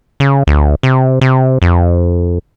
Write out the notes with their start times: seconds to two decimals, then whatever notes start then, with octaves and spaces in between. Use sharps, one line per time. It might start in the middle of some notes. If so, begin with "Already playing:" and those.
0.20 C#3
0.47 D2
0.83 C3
1.21 C3
1.62 F2